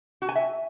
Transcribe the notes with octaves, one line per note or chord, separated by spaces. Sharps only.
F#4
G#5
E5